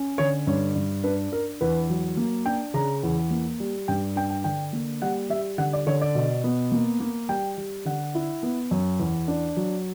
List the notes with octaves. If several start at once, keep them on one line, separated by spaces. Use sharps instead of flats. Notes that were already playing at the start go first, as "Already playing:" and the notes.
Already playing: C#4
D3 C#5
G2 C#5
G2
D4 B4
D4 A#4
E2 B4
F#3
A#3
D4 G5
C#3 A#5
E2
A#3
G3
G2 G5
D4 G5
G5
D3 G5
A#3
G3 F#5
G3 E5
D3 F#5
D5
D3 C#5
D5
B2
B3
A#3
A#3
G3 G5
G3
D3 F#5
E4
B3
F#2
E2
D4
F#3